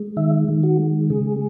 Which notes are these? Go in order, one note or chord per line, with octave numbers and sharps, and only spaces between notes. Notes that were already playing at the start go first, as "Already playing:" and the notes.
Already playing: G#3
D#3 E5
D#3
F#4
G#3
C#3 G#4